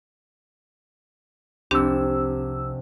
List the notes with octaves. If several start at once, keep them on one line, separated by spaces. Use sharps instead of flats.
F1 C2 C3 C4 D4 G4 E6